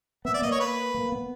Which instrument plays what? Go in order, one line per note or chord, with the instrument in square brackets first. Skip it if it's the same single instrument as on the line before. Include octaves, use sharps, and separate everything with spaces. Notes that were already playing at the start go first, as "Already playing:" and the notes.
[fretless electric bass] B3 [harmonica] E5
[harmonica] D5
[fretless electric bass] A#3 [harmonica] D#5
[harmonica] C#5
B4
[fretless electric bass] A#3
B3